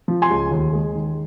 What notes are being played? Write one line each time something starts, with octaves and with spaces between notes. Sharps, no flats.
F3
G#5 C6
C#2
D#2
G#3
D#3